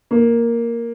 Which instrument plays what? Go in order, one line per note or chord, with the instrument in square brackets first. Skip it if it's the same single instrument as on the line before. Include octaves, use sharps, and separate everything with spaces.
[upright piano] A#3